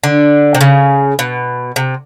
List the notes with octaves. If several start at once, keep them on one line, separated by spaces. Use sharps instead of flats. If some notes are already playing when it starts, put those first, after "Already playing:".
D3
C3
C#3
B2
C3